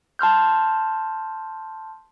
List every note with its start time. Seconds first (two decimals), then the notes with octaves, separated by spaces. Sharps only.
0.19 A5 C6 F6 G6